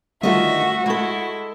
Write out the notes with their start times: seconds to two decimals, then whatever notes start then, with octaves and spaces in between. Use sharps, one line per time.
0.23 D2 D#3 G3 A3 F4 F#4 D#5 E5
0.86 G#3 E4 A4